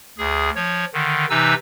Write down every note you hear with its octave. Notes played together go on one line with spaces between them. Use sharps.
D2 G#4
F3 C#5
D3 D#3
C3 E3 D#4 B4 E6